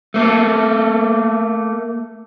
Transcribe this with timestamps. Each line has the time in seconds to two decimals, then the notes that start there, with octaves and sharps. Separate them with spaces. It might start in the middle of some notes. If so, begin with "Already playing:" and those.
0.14 A3 A#3 A4